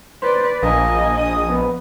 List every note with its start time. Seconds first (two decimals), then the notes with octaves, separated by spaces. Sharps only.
0.22 B4 C5 D5
0.62 A#1 A#3 D#5 G#5
1.19 D#6
1.50 B3